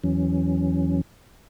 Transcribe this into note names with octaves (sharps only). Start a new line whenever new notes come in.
E2 E3 F#3 C#4